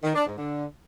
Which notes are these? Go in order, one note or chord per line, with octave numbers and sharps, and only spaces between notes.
D#3
D4
G#2
D3